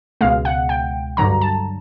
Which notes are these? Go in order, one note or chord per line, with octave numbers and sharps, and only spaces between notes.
C#2 B2 G#3 F5
F#5
G5
G2 D3 F#3 A#5
A5